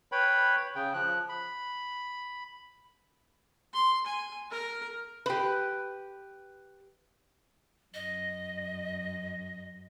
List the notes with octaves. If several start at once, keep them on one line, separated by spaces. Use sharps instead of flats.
B4 C#5 G5 B5
C#3 G5
F3 F#6
B5
C6
G#5
A#4
G4 B4
F#2 D#5